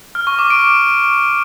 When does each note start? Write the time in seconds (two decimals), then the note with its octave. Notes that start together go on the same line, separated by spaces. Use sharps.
0.15 F6
0.27 C#6
0.39 D6
0.50 D7